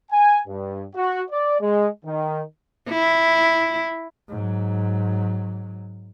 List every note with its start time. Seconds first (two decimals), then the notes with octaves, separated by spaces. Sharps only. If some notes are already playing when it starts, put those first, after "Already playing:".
0.11 G#5
0.47 G2
0.95 F#4
1.30 D5
1.61 G#3
2.05 D#3
2.90 E4
4.28 G#2 F#3